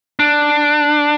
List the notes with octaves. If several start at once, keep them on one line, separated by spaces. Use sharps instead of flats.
D4